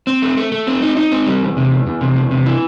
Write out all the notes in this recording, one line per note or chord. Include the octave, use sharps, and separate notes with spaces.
C4
A3
A3
A3
C4
D#4
D#4
C4
G3
E2
C3
E2
E2
C3
E2
C3
E3